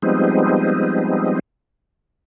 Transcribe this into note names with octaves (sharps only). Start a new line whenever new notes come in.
F3 G3 G#3 B3 C4 D#4